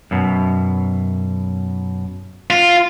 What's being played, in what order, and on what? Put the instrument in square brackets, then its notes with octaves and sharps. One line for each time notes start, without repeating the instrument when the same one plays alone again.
[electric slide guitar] F#2 B2
[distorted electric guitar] F4